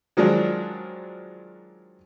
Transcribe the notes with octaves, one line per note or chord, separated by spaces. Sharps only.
D#3 F3 F#3 G#3 D4